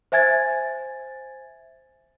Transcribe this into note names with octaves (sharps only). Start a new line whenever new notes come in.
C5 E5 G#5 G#6 A6